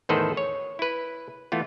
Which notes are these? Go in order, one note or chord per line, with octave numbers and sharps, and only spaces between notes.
E2 A2 D#3 A4 B4 C5
C#5
E4 B4
E3 A3 B3 F4